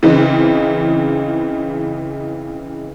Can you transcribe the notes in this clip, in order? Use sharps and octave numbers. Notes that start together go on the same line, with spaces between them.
C#3 E3 C4 D#4